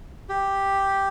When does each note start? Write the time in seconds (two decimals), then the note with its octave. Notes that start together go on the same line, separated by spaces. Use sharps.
0.29 G4